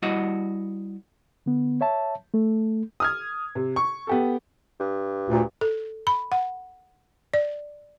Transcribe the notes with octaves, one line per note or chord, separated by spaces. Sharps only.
G3 E4 F#4 D#5 F#5
D3 B3
C#5 E5 A5
A3 A4
D#6 F6 G#6
C3
C#6
B3 G4 A4
G2
D2 A#2
A4
B5
F#5
D5